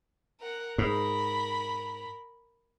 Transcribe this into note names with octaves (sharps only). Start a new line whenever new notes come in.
A#4 F#5
G#2 A#4 B5